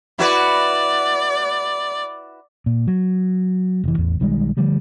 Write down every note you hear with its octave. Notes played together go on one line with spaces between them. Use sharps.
E4 F#4 B4 D5
A#2
F#3
F1 E3
A1 E2
B1 D#3 G3 G#3
D3 F3 G3 A3